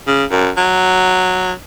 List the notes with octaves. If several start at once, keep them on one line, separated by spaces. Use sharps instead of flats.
C#3
F#2
F#3